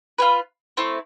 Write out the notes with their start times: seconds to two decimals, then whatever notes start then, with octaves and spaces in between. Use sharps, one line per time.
0.18 F4 G#4 B4
0.77 A3 C4 E4